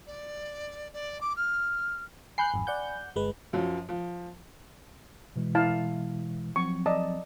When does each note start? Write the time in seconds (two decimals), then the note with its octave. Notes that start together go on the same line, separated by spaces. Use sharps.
0.07 D5
0.93 D5
1.21 D6
1.36 F6
2.38 G#5 B5 F#6 G6 C7
2.54 G#1 F2
2.67 D5 F#5 G6
3.16 G1 G#3 B4
3.53 F#2 F3 F#3
3.89 F3
5.36 B2 E3 G#3
5.55 E4 F5 A5
6.56 F3 F#3 C4 C#6
6.86 D5 D#5 A5